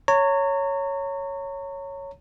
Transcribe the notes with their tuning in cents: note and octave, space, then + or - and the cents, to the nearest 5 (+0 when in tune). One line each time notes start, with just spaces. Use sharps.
C#5 +0 A#5 -35